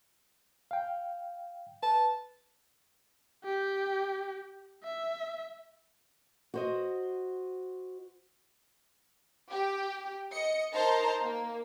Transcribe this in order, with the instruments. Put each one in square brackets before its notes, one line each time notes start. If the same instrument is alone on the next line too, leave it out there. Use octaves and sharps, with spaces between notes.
[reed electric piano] F5 G5
[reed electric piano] B4 [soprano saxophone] A5
[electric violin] G4
E5
[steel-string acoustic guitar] F#4 C5 D#5
[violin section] G4
D#5 C#7
D#4 A#4 C5 A5 A#5 C6
A#3